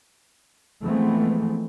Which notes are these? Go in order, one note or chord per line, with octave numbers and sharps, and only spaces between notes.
E3 F3 G#3 A3 B3 C4